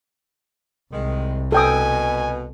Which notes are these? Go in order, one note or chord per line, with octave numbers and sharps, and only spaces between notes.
C2 D#3 G#3
B2 A4 G5 G#5 D#6